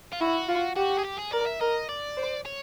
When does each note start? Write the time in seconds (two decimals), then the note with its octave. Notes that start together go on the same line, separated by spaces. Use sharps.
0.12 F4
0.21 E4 F#4
0.49 F4
0.76 F#4 G4
0.99 G#4
1.05 G4
1.19 G#4
1.33 A#4 D5
1.47 E5
1.61 A#4 D#5
1.89 D5
2.17 C5
2.45 C#5